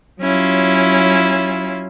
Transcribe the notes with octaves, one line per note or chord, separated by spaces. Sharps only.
F#3 C#4 E4 F4